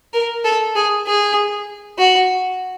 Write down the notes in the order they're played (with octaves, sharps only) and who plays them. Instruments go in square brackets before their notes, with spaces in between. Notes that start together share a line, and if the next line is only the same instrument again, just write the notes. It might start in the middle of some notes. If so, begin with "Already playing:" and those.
[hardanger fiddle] A#4
A4
G#4
G#4
F#4